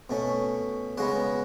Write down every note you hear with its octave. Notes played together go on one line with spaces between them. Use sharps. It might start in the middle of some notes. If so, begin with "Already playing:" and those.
B2 A3 C#4
C#3 G#3 B3 F#4 F#5